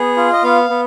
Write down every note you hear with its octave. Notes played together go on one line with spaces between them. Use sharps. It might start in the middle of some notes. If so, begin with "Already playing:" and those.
Already playing: B3 G#4
F4
D#5
B3 F5
B3